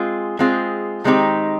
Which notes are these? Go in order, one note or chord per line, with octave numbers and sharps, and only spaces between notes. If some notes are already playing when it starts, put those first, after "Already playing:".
Already playing: G#3 C4 F4 G#4
G#3 C4 F4 G#4
D#3 G#3 C4 D#4 G4